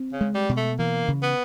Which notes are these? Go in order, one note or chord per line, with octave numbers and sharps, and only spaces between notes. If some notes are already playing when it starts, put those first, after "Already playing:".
Already playing: C4
C#3
G#3
G3
B2
A3
E3 A#3
C#3
B3